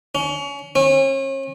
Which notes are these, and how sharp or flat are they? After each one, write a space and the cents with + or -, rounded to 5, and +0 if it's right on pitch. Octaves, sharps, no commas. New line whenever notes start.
C#4 +30
C#4 -40